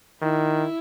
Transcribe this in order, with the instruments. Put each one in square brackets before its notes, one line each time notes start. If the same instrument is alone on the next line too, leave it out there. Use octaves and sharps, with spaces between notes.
[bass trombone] D#3 [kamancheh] E4